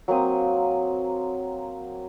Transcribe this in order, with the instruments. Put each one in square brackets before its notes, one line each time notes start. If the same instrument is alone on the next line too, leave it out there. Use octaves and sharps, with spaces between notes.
[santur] F#3 A#3 C4 D#6